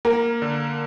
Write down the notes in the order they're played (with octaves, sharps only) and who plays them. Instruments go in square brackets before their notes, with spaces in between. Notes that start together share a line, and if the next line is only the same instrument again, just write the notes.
[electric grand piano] A#3 [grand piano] A#4
[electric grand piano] D3